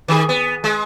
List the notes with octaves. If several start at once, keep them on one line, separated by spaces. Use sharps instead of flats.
D#3 G#4
B3
G#3